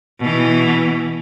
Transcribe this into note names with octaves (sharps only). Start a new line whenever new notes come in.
B2 E3